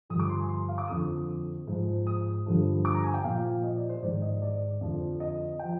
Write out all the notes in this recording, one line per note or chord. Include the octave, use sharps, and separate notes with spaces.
G2 D3 F3 D#6
D6
C6
G#5
C6
F5
D6
F2 D3 F3 D#6
G#2 F3
D#6
G2 D3 F3
D6
A#5
G#5
G5
A#2 F3 F5
D#5
D5
C5
G#2 D#3 D5
D#5
D5
F2 D3 F3
D#5
F3 G5